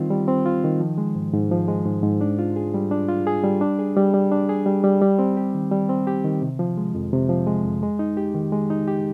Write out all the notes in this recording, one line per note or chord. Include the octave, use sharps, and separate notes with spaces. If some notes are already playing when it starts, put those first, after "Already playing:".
Already playing: D#3 G3 C4 F4
G3
C4
F4
D#3
F3
G#3
G#2
G#2
F3
G#3
G#2
G#2
D4
F4
G#4
G3
D4
F4
G#4
G3
D4
G#4
G3
G3
D4
G#4
G3
G3
G3
C4
G4
D#3
G3
C4
G4
D#3
C3
F3
G#3
F2
C3
F3
G#3
F2
G#3
D#4
G4
D#3
G#3
D#4
G4